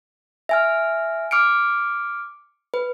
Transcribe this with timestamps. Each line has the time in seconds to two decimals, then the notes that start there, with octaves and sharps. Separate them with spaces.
0.49 E5 G#5 F6
1.31 D6 F6 C#7 D7
2.74 B4